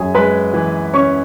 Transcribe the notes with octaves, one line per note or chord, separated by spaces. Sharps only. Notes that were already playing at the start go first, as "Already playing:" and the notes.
Already playing: F#2 G#4 G#5
G#3 B4 B5
E3
C#4 C#5 C#6